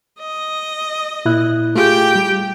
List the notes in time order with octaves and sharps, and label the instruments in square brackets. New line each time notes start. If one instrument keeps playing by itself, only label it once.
[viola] D#5
[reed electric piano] A#2 E4 F#6
[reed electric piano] A3 F4 G#4 [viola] G4 G5
[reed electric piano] G3